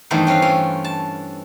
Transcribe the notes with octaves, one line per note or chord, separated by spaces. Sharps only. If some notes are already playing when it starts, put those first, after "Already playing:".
E2 G2 D#3 A3 B3 C5
C4 C#4 B4 F5
E3 C#4 F4
A5